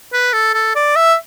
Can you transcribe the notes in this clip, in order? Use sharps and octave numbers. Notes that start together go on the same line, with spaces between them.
B4
A4
A4
D5
E5